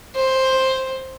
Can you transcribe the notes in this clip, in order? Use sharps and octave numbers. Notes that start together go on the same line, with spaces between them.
C5